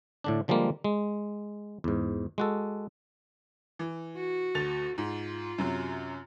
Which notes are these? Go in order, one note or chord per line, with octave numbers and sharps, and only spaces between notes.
A2 D3 D4
D3 F3 G3 G#3 A#3
G#3
E2 G#2
G#3 F#4 A4
E3
F#4
D2 A6 F7
G#2 F4
F#2 C3 F#3